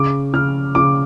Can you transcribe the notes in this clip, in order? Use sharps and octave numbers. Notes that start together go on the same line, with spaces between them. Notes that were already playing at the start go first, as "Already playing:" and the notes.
Already playing: C#3 D6
C#3 F6
C#3 D6